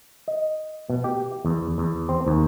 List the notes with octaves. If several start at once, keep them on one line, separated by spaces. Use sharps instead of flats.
D#5
B2
G4
E2
E2
C4
D#2